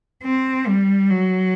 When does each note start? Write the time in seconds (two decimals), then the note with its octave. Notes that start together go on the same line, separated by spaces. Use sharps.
0.24 C4
0.67 G3
1.11 F#3